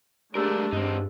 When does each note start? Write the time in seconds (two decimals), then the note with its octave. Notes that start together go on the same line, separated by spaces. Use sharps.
0.35 G#3 A3 D4 G4 A#4 E6
0.73 G2 C4 D#4